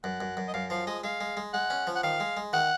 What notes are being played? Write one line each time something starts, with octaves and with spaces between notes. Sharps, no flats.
F#2 F#5
F#2
F#2
D#5
F#2 F5
F3 F5
G#3 D#5
G#3 F5
G#3
G#3
G#3 F#5
C#4
F3
F#5
D#3 F5
G#3
G#3
D#3 F#5